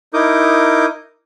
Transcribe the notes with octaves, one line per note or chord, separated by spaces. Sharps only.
D#4 E4 A#4 D6 D#6 G6